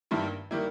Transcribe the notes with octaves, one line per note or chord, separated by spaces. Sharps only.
G2 D#3 G3 A#3 E4
D#3 G3 A#3 E4